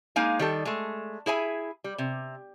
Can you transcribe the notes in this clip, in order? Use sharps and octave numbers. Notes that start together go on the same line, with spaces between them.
G#3 A#3 D#4 F5 G#5
D#3 G3 A4
G#3 A3
E4 G#4 E5 G#5
G3
C3